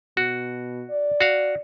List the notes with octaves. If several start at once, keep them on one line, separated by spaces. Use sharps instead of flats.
B2 F#4
D5
F#4 F5